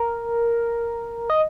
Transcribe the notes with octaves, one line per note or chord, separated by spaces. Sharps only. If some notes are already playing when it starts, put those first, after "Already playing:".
Already playing: A#4
D#5